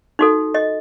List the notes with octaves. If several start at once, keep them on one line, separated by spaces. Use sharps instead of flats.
D#4 F#4 A4
D#5